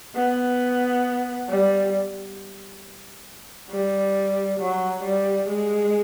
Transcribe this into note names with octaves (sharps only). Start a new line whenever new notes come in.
B3
G3
G3
F#3
G3
G#3